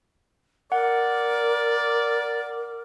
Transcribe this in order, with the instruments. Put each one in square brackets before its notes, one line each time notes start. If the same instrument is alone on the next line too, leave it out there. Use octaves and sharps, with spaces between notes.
[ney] A#4 [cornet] D5 [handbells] F#5